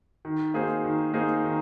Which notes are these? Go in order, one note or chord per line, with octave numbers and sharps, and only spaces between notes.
D#3
A#3 D#4 G#4 C5
D#3
A#3 D#4 G#4 C5
D#3